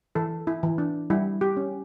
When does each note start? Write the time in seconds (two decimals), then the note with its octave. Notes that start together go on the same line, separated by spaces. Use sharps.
0.15 E3 A4
0.47 E4
0.63 E3
0.78 D4
1.10 G3 E4
1.41 G4
1.57 C#4